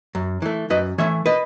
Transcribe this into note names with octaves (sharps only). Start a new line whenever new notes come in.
F#2
E3 A3
F#2 B4 D#5
E3 A3 C#5 E5
B4 D#5